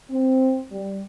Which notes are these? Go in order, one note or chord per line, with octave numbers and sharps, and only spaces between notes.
C4
G3